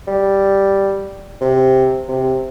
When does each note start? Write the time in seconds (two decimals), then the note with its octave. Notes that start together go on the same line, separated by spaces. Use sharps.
0.07 G3
1.41 C3
2.08 C3